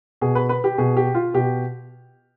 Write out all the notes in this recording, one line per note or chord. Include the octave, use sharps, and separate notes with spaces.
B2 G#4
B4
B4
G4
B2 G#4
G4
F4
B2 G4